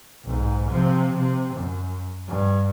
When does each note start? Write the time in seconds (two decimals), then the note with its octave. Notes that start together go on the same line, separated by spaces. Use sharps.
0.25 B1 G#2
0.70 C3 F3
1.17 C3
1.56 F#2
2.28 G2